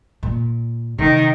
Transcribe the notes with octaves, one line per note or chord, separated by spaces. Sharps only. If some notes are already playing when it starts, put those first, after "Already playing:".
A#2
C3 D#3